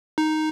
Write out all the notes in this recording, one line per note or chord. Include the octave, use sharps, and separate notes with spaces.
D#4